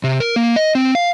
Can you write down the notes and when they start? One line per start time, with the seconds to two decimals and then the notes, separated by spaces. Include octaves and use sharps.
0.04 C3
0.20 A#4
0.36 A#3
0.56 D#5
0.75 C4
0.95 F5